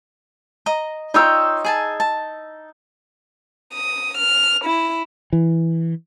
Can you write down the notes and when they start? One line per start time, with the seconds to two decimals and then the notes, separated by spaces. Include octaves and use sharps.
0.66 D#5 A#5
1.14 D#4 F4 C#5 G5 E6
1.65 G#4 G#5 A5
2.00 A5
3.73 D#6
4.17 F6
4.64 E4
5.33 E3